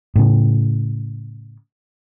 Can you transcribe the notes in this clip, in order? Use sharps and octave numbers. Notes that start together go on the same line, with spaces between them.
A2 C#3